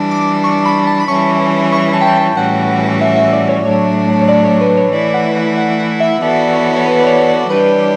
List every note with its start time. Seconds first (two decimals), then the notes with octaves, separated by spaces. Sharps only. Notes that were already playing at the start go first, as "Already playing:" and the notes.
Already playing: E3 G3 D4
0.11 D6
0.44 C#6
0.65 B5
0.87 A5
1.00 B5
1.08 E3 G3 C#4 E4 C#6
1.73 C#6
1.93 A5
2.01 G5
2.07 A5
2.15 G5
2.36 A2 E3 G3 C#4 F#4 F#5
3.01 E5
3.16 E5
3.33 D5
3.49 C#5
3.65 A2 F#3 A3 D4 C#5
4.21 C#5
4.28 D5
4.45 C#5
4.61 B4
4.77 C#5
4.93 E3 A3 E4 D5
5.14 F#5
5.36 F#5
5.58 F#5
5.79 F#5
6.00 E5
6.21 E3 B3 F#4 A4 D5
6.53 C#5
6.76 C#5
6.86 B4
7.00 D5
7.07 C#5
7.29 D5
7.49 E3 G3 D4 G4 B4